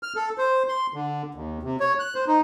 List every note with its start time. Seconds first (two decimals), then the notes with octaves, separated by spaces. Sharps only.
0.03 F6
0.16 A4
0.38 C5
0.68 C6
0.94 D3
1.34 D#2
1.63 C3
1.80 C#5
1.99 F#6
2.15 C5
2.27 D#4